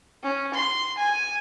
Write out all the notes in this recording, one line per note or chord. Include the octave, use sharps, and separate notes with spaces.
C#4
C6
G#5